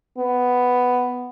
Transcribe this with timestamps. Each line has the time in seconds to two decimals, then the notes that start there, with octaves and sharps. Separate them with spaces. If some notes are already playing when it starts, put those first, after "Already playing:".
0.18 B3